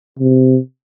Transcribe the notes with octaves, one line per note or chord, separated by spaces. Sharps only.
C3